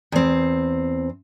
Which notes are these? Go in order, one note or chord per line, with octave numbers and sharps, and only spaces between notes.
E2 C4